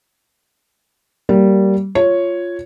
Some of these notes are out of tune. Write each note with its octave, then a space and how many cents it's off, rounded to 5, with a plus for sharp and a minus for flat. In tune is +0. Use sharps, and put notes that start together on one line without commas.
G3 -20 A#3 -10
F4 +0 C#5 +0